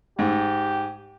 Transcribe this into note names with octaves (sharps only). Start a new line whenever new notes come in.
G#2 G4